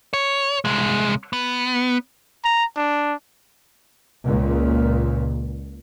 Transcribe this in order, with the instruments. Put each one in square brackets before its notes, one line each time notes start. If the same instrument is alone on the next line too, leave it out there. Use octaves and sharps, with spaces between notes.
[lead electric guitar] C#5
C2 G#3
B3
[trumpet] A#5
D4
[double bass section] C#2 A#2